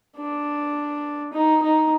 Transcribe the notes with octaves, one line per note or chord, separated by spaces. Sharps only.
D4
D#4
D#4